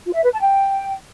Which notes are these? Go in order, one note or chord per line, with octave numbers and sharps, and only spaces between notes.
F4
E5
B4
A5
G5